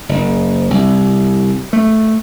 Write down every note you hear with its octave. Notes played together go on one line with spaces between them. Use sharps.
F#1
C2
A3